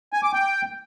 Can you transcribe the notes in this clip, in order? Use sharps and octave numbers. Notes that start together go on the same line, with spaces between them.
G#5
D6
G5